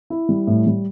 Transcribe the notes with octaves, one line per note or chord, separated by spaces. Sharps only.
E4
G3
A2
G3